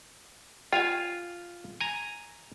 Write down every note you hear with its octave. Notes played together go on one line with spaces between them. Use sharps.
F4 F5 G5 G#5
G#5 A#5